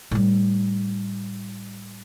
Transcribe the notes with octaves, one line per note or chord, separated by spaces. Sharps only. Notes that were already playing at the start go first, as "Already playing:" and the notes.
A2 G3